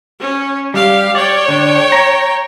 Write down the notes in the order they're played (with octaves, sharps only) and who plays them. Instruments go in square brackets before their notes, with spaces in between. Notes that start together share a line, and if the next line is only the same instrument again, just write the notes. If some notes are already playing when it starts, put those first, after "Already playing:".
[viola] C#4
[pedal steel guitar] G3 [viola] G4 F5
[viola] C#5 G5 [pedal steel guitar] D5
[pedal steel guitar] D3 D4
A#5